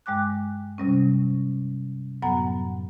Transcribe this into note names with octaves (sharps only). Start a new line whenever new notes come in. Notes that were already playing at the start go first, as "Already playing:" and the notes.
G2 G#3 G5 D6 F#6
C3 G3 C#4
F#2 A2 F#3 B3 F#5 A#5